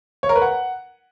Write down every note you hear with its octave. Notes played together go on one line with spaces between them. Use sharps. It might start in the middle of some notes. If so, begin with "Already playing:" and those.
C#5
A#4
B4
F#5